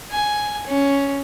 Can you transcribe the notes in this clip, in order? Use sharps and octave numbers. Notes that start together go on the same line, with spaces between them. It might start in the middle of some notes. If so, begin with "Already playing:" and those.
G#5
C#4